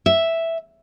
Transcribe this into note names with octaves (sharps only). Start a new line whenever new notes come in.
E5